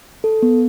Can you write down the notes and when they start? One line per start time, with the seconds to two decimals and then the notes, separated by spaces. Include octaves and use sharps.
0.24 A4
0.42 B3